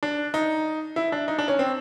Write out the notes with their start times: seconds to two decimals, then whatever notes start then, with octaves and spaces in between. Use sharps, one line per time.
0.03 D4
0.34 D#4
0.96 E4
1.12 D4
1.28 D#4
1.38 D4
1.48 C#4
1.59 C4